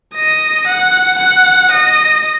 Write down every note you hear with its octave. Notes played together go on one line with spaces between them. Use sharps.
D#5
F#5
F#5
D#5